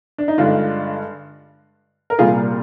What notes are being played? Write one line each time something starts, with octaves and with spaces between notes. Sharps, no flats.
D4
D#4
G2 D3 G#3 D4 F4
A#4
C2 A#2 G3 F4 G#4